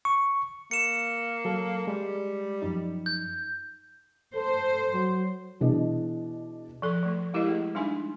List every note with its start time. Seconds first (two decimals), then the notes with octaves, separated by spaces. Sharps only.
0.05 C#6
0.71 A#3 C#7 E7
1.45 F#3 A4
1.87 G3 G#3
2.62 F#2 F3 D#4
3.06 G6
4.35 A4 C5
4.93 F#3
5.61 B2 E3 D4 G#4 D#5
6.82 F3 A4 C6
7.03 F3 A3
7.34 G#3 E4 G4 A#4 D#5
7.47 A3 G#4
7.75 G3 G#3 D4 D#4 G#5 C6